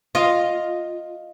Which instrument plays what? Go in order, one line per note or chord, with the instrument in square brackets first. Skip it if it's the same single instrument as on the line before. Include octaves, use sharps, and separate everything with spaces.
[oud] F4 [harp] D#5